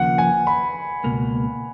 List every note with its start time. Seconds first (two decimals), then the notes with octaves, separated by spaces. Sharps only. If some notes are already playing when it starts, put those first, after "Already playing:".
Already playing: D#2 C#3 F3 A#3 F#5
0.18 G#5
0.47 B5
1.04 C#2 B2 A#3